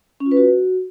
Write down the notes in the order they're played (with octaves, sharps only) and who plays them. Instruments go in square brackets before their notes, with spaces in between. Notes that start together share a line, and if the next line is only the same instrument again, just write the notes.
[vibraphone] C#4
F4
B4
F#4